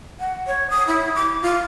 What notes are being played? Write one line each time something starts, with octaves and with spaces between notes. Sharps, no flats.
F#5
C#5
D#6
E4
D6
F4